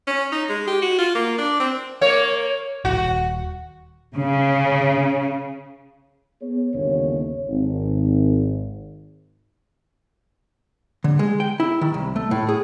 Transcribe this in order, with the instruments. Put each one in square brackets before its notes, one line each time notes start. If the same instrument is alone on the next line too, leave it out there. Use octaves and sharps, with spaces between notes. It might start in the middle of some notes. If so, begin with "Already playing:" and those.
[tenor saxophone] C#4
D#4
G#3
G4
F#4
F4
A#3
D4
C4
[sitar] A#3 C#5
[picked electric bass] D#1 G#1 [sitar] F#4
[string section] C#3
[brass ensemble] B3 G#4 C#5
G1 D#2 C#3 C#5
G#1
[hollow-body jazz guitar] D3
G#3
G5
E4
D#3
C2
A3
A2
G#4